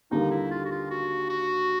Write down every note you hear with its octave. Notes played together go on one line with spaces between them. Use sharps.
D#2 D3 G3 A#3 D#4
E4
F4
F#4
F4
F#4
F#4